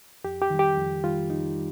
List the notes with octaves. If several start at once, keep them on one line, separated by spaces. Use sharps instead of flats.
F2 G4
G4
D#3 G3
G4
F2
D#3 G3 F4
F2 D#4
G3